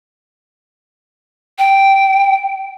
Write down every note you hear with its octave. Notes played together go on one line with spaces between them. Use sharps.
G5